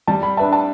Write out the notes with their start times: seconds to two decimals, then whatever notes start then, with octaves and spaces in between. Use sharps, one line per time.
0.07 G3 A5
0.23 B5
0.37 D4 B4 E5 A5
0.53 A5